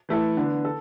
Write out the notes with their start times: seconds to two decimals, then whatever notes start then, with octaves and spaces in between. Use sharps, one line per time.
0.09 E3 A3 E4 A4
0.37 D3 B3 D4
0.65 A4